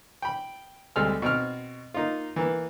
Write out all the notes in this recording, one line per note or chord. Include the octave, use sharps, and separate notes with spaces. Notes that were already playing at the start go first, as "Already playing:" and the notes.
G5 B5
D2 G3 G#3 C4 A4 F6
B2 C4 F6
A#3 D#4 F4
E3 A#3 B3